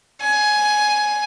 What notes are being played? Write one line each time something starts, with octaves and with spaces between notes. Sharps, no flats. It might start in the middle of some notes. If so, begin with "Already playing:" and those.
G#5